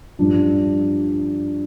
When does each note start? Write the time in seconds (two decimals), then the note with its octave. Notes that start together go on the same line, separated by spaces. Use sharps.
0.19 G2 F3 D4